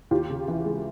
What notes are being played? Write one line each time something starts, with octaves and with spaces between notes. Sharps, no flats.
D#2 F4 G4
C#3
E3
G#3